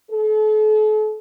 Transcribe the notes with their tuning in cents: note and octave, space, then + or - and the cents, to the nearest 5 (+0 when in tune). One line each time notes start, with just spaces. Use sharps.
A4 -40